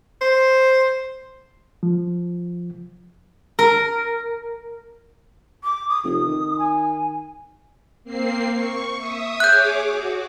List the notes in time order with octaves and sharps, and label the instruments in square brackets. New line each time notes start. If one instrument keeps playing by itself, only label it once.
[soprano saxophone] C5
[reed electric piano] F3
[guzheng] A#4
[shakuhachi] D6
D#6
[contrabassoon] F1 [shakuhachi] D#6
[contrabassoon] D#3
[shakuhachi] G#5
[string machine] A#3 C4 C7
C#6
E5 D#6
[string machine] G#4 C#5 D6 [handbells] F#6 G6
[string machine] F#4